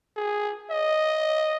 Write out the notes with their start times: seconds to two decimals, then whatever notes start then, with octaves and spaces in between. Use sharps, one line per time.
0.17 G#4
0.71 D#5